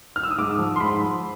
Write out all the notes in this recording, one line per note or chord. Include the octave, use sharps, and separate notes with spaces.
F6
E6
D#6
G#2 D6
F3
C6
G#2 B5
F3